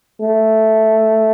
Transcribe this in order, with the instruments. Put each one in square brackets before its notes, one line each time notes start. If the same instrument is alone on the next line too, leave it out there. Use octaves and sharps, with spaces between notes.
[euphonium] A3